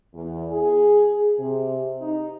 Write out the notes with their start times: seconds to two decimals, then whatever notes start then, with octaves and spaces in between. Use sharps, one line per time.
0.13 E2
0.50 G#4
1.39 C3
2.01 D#4